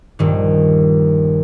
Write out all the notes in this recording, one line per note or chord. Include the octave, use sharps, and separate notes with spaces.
A#1 G2 D#3